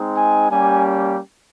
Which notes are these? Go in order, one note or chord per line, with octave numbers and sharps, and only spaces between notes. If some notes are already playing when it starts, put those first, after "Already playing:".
Already playing: G#3 C4 D#4
G#5
G3 A#3 C#4 G4 G#5